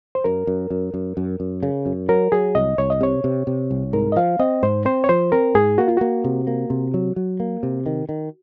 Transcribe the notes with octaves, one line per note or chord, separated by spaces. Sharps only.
C5
F#2 A#4
F#2
F#2
F#2
F#2
F#2
C#3
F#2
F#3 A#4
F#3 G#4
C2 D#5
C2 C#5
D#5
C3 C#5
C3
C3
C2
G#2 A#4
D#5
F3 F5
C4 D#5
G#2 C5
C4 C5
C#5
F3 C5
C4 A#4
G#2 G#4
A#3 F#4
F4
A#3 F#4
C3
A#3
C3
F#3
F#3
A#3
C3
D#3
D#3